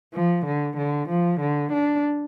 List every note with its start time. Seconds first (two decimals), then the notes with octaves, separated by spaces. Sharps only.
0.14 F3
0.46 D3
0.77 D3
1.09 F3
1.40 D3
1.72 D4